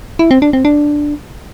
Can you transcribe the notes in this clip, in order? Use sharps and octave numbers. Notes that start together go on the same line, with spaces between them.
E4
C4
D4
C4
D4